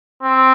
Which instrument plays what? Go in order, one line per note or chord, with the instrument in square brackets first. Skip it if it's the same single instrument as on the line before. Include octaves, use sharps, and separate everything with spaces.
[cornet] C4